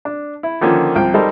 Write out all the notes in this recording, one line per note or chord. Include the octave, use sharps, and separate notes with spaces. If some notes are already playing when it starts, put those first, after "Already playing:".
D4
E4
D3 D#3 F3 A#3 C#4
C2 F3 G5
G3 D#4 A4 A#4 C5